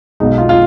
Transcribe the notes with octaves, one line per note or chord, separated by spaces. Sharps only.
B1 B2 G#3 D#4
F4
F4